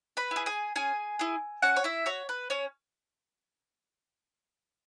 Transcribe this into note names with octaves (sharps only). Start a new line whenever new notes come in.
B4 B5
E4 G#4
G#4 G#5
C#4 G#4 G#5
E4 G#4
C#4 F#4 F#5
C#5
E4 E5
F#4 C#5
B4
C#4 C#5